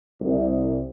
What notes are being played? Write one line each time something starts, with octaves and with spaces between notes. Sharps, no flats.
C2